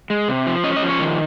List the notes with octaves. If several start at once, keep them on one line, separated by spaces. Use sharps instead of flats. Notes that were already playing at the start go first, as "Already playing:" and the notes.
G#3
C3
F3
C#4 D#5
D#5
F3
C#5
D#3